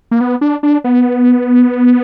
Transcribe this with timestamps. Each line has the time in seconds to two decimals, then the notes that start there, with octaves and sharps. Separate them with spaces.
0.11 A#3
0.21 B3
0.41 D4
0.63 D4
0.84 B3